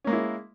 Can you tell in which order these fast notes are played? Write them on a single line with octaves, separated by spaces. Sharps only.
C#4 A#3 G#3 E4